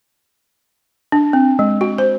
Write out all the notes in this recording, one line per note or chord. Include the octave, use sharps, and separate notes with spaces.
D4
C4
G#3
F#4
C5